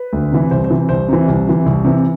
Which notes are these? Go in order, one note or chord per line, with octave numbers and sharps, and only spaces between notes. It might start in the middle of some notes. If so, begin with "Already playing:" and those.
Already playing: B4
D2
C3 E3
C2 C5
C5
C3 E3
C2 C5
C3 E3
C2
C3 E3
C2
C3 E3